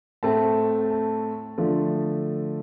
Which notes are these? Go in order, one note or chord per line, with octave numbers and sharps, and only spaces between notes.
A2 A3 C4 A5
A5
D3 F3 A3